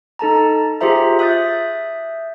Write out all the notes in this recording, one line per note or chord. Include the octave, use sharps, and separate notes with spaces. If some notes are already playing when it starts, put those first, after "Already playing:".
D#4 A4 A5 A#5
F4 G4 G#4 C5 E5 A#5
E5 D#6 F#6 G6 A6